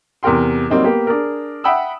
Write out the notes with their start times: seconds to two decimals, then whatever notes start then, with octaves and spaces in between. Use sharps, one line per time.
0.23 E2 C3 A#4 G5 C6
0.70 F#3 G3 A#3 C4 D#4
0.84 A#3 B3 G4
1.07 D4 G#4 A#4
1.64 E5 F#5 G5 B5 D#6 E6